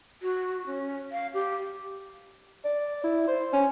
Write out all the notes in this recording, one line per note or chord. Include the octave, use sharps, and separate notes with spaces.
F#4
C#4
F5
G4
D5
E4
C5
C#4